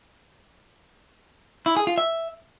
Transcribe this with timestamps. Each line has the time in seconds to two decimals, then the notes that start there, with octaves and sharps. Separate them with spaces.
1.66 E4
1.77 G#4
1.87 F4
1.98 E5